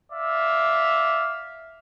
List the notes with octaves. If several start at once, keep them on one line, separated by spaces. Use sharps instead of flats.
D5 E5 F5